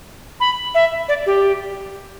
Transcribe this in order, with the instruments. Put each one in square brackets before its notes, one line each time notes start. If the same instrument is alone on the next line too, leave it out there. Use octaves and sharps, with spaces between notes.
[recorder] B5
E5
D5
G4